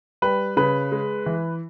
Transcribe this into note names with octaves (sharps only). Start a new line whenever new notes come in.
G3 B4
C#3 B4
G#3
E3